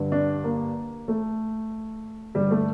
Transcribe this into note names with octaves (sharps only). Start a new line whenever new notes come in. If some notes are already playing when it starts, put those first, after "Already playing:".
Already playing: G2 D3
D4
A#3
A3
G2 D3 G3
A3